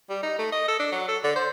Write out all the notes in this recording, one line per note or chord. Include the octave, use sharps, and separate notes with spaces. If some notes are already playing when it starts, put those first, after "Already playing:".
G3
D#4
A3
D#5
A4
D4
F#3
A4
D3
C5